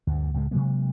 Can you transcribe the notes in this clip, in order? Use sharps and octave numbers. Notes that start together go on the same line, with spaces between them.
D2 G2
C#2 A2 D#3 G#3
C3 F#3 G#3 A#3